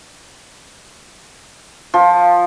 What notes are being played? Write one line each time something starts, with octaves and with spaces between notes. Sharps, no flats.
F3